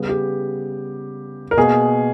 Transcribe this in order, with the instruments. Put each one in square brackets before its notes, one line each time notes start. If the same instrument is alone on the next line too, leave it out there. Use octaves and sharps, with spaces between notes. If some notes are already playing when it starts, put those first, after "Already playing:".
Already playing: [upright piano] C#3 G3 B3
G4
A#4
B2 A#3 G#4